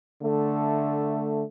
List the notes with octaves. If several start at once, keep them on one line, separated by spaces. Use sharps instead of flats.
D3 A3